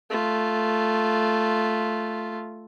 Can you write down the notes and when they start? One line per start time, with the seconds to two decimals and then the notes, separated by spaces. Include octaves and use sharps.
0.10 A3 F4